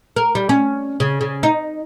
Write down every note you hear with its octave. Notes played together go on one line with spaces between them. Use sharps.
A#4
G3
C#4
C#3
C#3
D#4